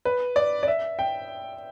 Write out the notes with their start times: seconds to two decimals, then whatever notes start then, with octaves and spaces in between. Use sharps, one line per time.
0.05 B4
0.36 D5
0.63 D5
0.68 E5
0.99 G5